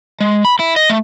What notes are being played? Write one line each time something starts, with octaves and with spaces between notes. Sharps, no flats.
G#3
B5
E4
D#5
A3